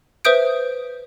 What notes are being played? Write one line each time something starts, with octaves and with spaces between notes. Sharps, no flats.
B4 C5 E5 D#6 G6 D7